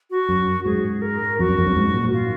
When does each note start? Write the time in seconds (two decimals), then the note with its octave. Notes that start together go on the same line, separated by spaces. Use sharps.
0.10 F#4
0.29 F#2
0.65 G#2 G#4
1.02 A#4
1.39 F2 F#4
1.49 F#2
1.58 F2
1.67 F#2
1.76 G#2
1.94 A#2
2.14 F4